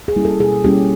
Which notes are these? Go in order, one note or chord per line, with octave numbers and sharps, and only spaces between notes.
G#4
G3 A#3 C#4 E4
A4
B2 G#4
G3 A#3 C#4 E4 G4